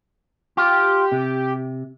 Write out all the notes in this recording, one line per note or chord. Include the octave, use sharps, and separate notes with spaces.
F4 G4
C3